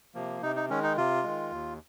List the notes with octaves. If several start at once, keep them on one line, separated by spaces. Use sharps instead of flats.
C3 F3 A#3
C3 D#4
D#4
D#3 G#3 C#4
D#4
C3 F4
D#3 G#3
D#2